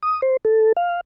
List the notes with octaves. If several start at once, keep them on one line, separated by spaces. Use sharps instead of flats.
D#6
C5
A4
F5